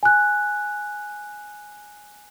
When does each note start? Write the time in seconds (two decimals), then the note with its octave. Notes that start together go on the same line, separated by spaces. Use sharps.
0.03 G#5 F#6